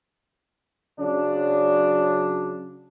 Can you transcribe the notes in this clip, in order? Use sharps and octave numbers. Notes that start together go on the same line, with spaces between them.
C#3 F#3 D4